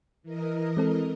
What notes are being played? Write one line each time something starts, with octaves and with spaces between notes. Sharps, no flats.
E3 A#4 D#5
G#3 C4 A4